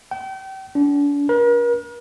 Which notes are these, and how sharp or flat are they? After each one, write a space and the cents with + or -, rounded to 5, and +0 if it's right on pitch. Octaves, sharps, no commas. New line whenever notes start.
G5 -35
D4 -40
A#4 +45